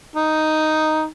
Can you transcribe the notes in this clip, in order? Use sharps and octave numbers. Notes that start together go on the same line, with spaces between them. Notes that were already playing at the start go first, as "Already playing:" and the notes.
D#4